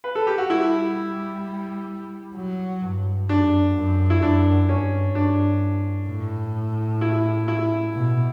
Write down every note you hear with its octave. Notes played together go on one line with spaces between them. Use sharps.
B4
A4
G4
F#4
G3 E4
F#3
G2
F#2 D4
F#2
E4
F#2 D4
G2 C#4
D4
A2
E4
E4
B2